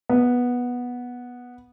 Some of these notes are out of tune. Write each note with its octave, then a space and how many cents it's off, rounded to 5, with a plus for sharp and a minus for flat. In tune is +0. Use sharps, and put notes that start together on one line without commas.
B3 -10